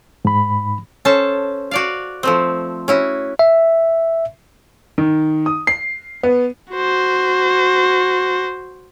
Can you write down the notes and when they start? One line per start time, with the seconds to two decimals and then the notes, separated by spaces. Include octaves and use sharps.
0.25 G#2 B5
1.05 C#4 A4 C5 A5
1.71 F#4 D5 F5
2.23 F3 A3 C4
2.88 C#4 E4 F#4
3.39 E5
4.98 D#3
5.46 D#6
5.67 C7
6.23 B3
6.72 F#4 C5